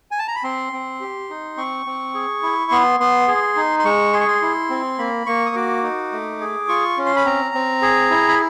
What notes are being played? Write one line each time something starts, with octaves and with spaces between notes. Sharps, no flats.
G#5
A5
A#5
B5
C4 C6
C4
G4
D#4
C4 C#6
C4
G#4
E4
B3 C6
B3 C6
G#4
D#4
C6
G#3 C#6
G#4 C6
C#6
C6
E4
C4
A#3 B5
A#3 C#6
D#6
F#4 D6
D#4
A3
G#4
F4 C#6
C#4
C6
B5
C4 A#5
C4
G#4
E4
B5